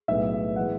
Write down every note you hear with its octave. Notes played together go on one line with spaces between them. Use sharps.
B1 A2 G#3 B3 E5
E3 G#3 B3 F#5